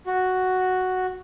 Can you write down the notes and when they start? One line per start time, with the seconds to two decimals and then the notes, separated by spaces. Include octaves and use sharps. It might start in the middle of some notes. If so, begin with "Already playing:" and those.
0.06 F#4